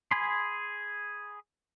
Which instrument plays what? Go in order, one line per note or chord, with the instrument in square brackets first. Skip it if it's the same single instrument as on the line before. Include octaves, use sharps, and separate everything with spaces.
[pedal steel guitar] G#4 G#5 B5 C6